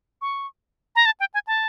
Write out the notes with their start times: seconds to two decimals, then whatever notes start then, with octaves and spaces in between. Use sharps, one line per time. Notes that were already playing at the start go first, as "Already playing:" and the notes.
0.22 C#6
0.96 A#5
1.06 A5
1.20 G5
1.34 G#5
1.47 A5